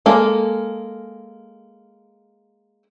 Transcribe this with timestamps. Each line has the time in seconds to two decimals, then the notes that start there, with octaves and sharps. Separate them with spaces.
0.06 G#3 A#3 A4